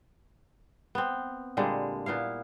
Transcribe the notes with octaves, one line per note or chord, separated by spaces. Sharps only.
B3 C4
A#2 D3 G3 G#3
A#2 B3 E4 F5